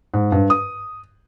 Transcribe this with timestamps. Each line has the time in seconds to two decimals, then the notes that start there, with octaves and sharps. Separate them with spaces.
0.14 G#2
0.32 G2
0.50 D#6